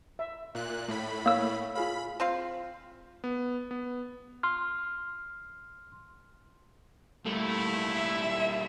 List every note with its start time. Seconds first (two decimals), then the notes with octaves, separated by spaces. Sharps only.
0.19 E5
0.55 A#2 F#6
0.88 A2 B5
1.26 A#3 C#5 E6
1.75 F4 G#4 F5 B5
2.20 C4 F4 F5
3.24 B3
3.71 B3
4.43 C6 F6
7.26 G3 A3 A#3 E4
7.93 E5